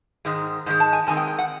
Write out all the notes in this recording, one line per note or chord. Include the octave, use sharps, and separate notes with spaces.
G#2 D#3 G#3
G#2 D#3 G#3
A5
G#5
G#2 D#3 G#3 C4 G#5
G5
G5
F#5